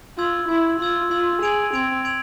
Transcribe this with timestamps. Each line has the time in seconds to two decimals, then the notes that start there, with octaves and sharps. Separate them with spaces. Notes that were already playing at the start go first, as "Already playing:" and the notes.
0.18 F4 C6 E6 G#6
0.49 E4 C6 E6 G#6
0.80 F4 C6 E6 G#6
1.11 F4 C6 E6 G#6
1.42 G#4 C6 G#6 D7 F7
1.73 C4 C6 G#6 D7 F7
2.05 C6 G#6 D7 F7